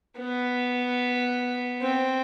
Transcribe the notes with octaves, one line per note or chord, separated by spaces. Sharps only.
B3
C4